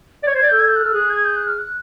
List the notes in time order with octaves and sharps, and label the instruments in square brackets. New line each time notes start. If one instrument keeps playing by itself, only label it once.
[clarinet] D5
[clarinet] C#5 [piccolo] G#6
[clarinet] C5
[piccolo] G#6
[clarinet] D5
[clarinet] A4 [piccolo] G6
[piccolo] G#6
G6
F#6
[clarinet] A4 [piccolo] F6
[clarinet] G#4 [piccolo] F#6
[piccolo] G#6
G6
F#6
F6
F#6